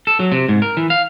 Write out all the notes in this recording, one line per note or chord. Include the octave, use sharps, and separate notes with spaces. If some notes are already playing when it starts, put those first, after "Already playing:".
A4
F#3
C3
G#2
A#4
E3
F5